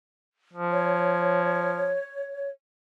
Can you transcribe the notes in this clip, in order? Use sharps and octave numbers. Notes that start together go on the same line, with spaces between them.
F3
C#5